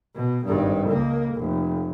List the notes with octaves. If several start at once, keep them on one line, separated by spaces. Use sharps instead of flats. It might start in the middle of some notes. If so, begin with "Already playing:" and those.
B2
G#1 G2
C#2 A#3
F1